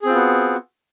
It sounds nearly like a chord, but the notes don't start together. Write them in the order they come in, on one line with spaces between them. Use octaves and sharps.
G#4 C4 F4 B3 F#4